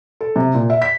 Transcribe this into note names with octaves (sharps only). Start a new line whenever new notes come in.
A4
C3
A#2
E5
B6